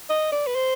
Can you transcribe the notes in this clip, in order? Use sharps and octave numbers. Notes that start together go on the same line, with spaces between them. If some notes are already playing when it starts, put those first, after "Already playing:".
D#5
D5
B4
C5